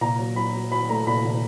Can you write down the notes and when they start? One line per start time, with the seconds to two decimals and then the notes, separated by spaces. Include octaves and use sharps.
0.01 A#2 A#5
0.19 F#3
0.36 F#3 B5
0.54 F#3
0.71 F#3 B5
0.89 A3 A#5
1.07 A#2 B5
1.25 A#2